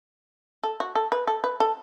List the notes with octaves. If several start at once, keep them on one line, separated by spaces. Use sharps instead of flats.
A4
F#4
A4
B4
A4
B4
A4